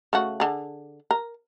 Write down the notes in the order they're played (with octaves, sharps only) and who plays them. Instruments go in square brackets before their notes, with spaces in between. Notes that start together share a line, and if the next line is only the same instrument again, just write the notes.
[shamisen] C#3 A3 F#4
D3 G#4
A#4